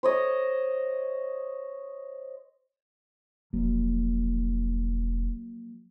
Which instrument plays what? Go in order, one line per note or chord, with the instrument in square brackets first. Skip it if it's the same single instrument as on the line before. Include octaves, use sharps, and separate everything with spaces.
[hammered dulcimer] C5 C#5 D#5
[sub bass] E1 [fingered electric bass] F3 F#3 A#3